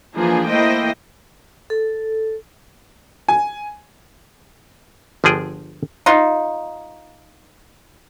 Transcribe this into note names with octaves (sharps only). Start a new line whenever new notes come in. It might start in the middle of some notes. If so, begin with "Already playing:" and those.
E3 F3 A#3 D4 G#4 B4
A3 A#3 E4 C5 D#5 G5
A4
G#5
G1 D3 F3 G#4 G5
D#4 F4